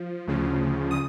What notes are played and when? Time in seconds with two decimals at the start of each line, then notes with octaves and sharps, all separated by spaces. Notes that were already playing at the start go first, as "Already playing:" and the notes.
Already playing: F3
0.27 D2 C#3 F3
0.91 D#6